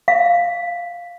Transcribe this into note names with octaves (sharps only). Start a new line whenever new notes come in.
F5